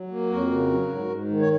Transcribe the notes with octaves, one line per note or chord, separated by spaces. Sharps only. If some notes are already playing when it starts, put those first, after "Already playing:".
Already playing: F#3
A#3
F2 F#4 A#4
C#3
F#3
G#2
G#2
D#3
C#5